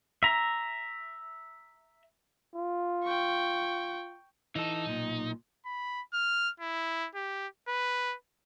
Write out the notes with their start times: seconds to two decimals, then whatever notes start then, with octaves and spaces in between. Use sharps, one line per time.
0.23 E5 A#5
2.55 F4
3.04 G5 C#6
4.56 E3 D#4 A4
4.86 B1 A#2
5.66 B5
6.14 F6
6.60 E4
7.15 G4
7.68 B4